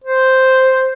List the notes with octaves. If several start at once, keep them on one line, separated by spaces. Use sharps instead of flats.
C5